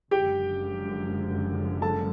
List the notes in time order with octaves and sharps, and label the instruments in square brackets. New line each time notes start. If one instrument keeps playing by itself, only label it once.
[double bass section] F#1 F#2 D3 F3 G#3 [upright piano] G4 G5
[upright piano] A4 A5